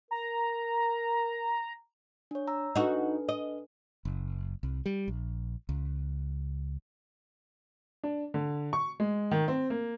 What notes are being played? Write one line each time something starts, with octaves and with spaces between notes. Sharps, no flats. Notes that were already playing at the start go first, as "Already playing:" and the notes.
A#4 A#5
D4 C#5
A#5 E6
D4 D#4 F#4 A4 B4
D#5
F#1
C2
G3
A#1
C#2
D4
D3
C#6
G#3
D#3
C4
A#3